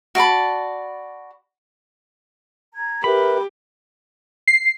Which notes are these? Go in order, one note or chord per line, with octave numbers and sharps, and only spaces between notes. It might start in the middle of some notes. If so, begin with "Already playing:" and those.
F#4 D5 A5 B5
A#5 G#6
G4 A#4 B4 E5 B5
C7